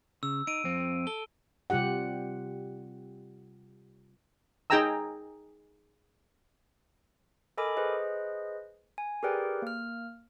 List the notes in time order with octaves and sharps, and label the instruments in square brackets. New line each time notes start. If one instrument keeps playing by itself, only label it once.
[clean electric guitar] C#3 [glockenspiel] E6
[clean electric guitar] D#4 [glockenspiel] D7 D#7
[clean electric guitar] F2 C4
[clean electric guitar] A4 [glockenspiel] G7
[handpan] C3 G3 F4 G4 F#5
[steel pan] D#4 G#4 G5 G#5 A#5 E6
[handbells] A4 A#4 D#5 G#5 B5 D6
G#4 B4 C5 D#5
G#5
G4 G#4 A#4 B4 D5 G5
A#3 F6